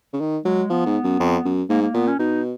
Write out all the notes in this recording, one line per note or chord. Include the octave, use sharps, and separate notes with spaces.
C#3
D#3
F#3 G#3
F3 B3
G#2
F#2
F2
F#2
G#2 A#3
A#3
A#2 B3
C#4
B2 D#4